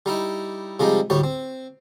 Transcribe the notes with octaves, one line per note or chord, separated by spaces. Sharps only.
G3 D#4 E4
C3 F3 G3 G#3 D#4
D2 A2 G3 C#5
C4